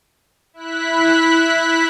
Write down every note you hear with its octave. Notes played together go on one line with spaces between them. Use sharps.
E4 F#6 B6